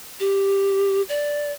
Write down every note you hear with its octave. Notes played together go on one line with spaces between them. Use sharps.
G4
D5